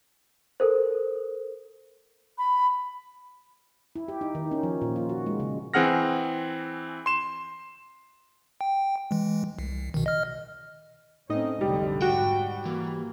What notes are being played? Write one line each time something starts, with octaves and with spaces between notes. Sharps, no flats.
A4 A#4 C5
B5
E4
G4
D#4
D#3
C#4
F3
A#2
F4
F#4
G#3
C#3
E3 C4 G#4 F#5 F6 A#6
C6 E7
G5
E3 G#3
C2
B2 D#3
D#5 F6
A2 A3 C4 C#4 D#4 D#5
F1 B1 D3 G3
G#2 F#4 G5
E3 A#3